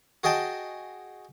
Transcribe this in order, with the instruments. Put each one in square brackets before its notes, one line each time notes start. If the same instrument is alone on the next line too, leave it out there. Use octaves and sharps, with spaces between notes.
[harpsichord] F#4 G#4 D#5 G5 A5